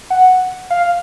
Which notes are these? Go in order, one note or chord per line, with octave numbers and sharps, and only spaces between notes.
F#5
F5